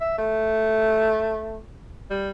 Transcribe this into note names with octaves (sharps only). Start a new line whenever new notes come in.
E5
A3
G3